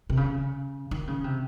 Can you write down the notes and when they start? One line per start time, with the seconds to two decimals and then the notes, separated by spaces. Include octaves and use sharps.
0.09 C3
0.17 C#3
0.91 D#3
1.07 C#3
1.24 C3